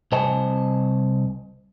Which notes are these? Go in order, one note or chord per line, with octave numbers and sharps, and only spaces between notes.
C2 C3 C5 D#5 G#5 A5